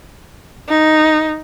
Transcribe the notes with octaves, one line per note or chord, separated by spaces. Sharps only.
D#4